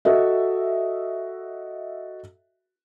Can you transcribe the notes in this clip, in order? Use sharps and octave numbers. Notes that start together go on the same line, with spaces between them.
F#4 A4 D#5 E5